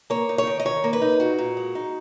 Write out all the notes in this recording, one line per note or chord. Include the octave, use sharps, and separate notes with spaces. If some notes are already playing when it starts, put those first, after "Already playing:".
A#3 C#5
D#4
C#5
D#3
D#5
D#3 C#5
A#3
B4
D#4
A#2 F#4
A#2
G#3
D#4